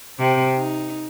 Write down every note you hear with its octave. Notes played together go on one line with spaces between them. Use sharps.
C3 C4
D#4